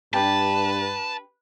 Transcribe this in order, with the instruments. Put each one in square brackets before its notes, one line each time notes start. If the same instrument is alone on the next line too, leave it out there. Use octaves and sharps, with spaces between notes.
[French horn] G2 [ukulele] D4 G4 [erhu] B4 [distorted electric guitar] A5